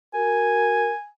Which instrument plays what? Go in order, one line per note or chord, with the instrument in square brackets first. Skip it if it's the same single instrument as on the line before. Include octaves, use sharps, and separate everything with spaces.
[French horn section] F#4 A#4 [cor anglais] G#5